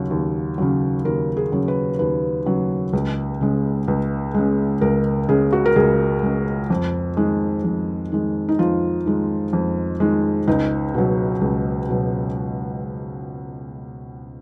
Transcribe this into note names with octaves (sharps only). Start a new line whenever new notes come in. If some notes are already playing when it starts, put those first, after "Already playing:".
Already playing: D#2 C#3 F#3
D#2
C#3 F#3
D#2 A#4
G#4
C#3 F#3
B4
D#2 B4
C#3 F#3
C#2
C#3 G#3
C#2
C#3 G#3
C#2 A#4
C#3 G#3 G#4
F#4
A#4
C#2 G#4
C#3 G#3
F2
D#3 G#3
F2
D#3 G#3
D#4
F2 F4
D#3 G#3
F2
D#3 G#3
C#2 D#4
B2 F#3
C#2
B2 F#3